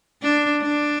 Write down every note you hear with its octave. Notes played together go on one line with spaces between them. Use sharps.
D4
D4